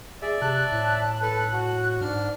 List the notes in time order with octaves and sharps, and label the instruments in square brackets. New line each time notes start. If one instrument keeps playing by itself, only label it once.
[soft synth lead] G#4 [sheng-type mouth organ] D5 E5
[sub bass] C3 [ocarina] A5 [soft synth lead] F#6
[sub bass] A2
[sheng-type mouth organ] A4 B4
F#4
[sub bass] G#2 [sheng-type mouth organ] D4 F6